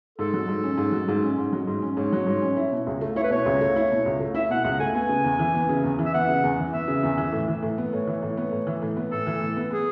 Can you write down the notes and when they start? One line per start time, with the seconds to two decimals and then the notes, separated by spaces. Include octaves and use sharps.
0.18 G#2 A4
0.34 F#3
0.48 G#2
0.64 C#4
0.77 G#2
0.92 F#3
1.08 G#2
1.23 C#4
1.38 G#2
1.53 F#3
1.67 G#2
1.82 C#4
1.97 G#2 C#5
2.12 F#3
2.27 G#2
2.42 C#4
2.57 E4
2.72 B2
2.87 C#2
3.01 A3
3.16 E4 C#5
3.23 B4
3.30 B2 C#5
3.46 C#2
3.61 A3
3.76 E4
3.91 B2
4.06 C#2
4.20 A3
4.35 E4 E5
4.50 B2 F#5
4.65 C#2 F#5
4.80 A3 G#5
4.95 B3 G#5
5.09 C#3
5.24 E2
5.39 E3
5.55 B3
5.69 C#3
5.84 E2
5.99 E3
6.05 E5
6.14 B3 F#5
6.28 C#3
6.44 E2
6.58 E3
6.73 B3 E5
6.88 C#3
7.03 E2
7.18 E3
7.32 A2
7.48 E3
7.63 A2
7.78 B3
7.93 A2 C#5
8.07 E3
8.22 A2
8.37 B3
8.52 A2
8.67 E3
8.82 A2
8.97 B3
9.11 A2 A4
9.27 E3
9.41 A2
9.56 B3
9.71 B3 G#4